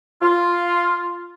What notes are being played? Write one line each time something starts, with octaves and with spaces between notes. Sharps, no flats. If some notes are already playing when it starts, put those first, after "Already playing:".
F4